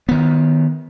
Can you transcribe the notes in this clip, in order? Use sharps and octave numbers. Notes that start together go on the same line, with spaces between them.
D#3 B3